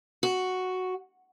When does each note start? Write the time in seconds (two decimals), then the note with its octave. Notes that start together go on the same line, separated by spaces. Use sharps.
0.23 F#4